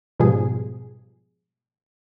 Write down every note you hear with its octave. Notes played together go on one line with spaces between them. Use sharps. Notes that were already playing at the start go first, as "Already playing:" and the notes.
G#2 B2 F3 G3 G#4